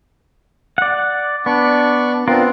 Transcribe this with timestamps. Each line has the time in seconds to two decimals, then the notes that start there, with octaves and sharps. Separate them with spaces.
0.78 D5 F#5
1.46 B3 D4 D5 C#6
2.28 B3 C4 D4 F4 A#4